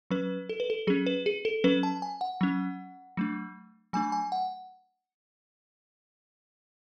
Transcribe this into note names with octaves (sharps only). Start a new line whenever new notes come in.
F#3 C#4 B4
A4
B4
A4
F#3 C#4 G#4
B4
G#4
A4
F#3 C#4 B4
A5
G#5
F#5
F#3 C#4
F#3 A3 D4
F#3 A3 D4 G#5
G#5
F#5